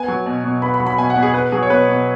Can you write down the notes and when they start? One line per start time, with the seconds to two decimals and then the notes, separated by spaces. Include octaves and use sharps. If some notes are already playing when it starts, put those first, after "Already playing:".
Already playing: B3 G#5
0.08 F#3
0.26 B2
0.44 B2
0.62 B3 B5
0.74 B5
0.80 F#3
0.87 B5
0.98 B2 G#5
1.10 F#5
1.16 B2
1.22 G#4
1.34 B3 B4
1.52 F#3 G#4
1.63 C#5
1.70 B2 B4
1.89 B2